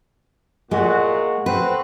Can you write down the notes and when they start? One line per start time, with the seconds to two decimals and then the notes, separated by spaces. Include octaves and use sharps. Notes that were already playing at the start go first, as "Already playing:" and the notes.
0.71 A#2 G#3 F#4
1.46 C4 F#4 B4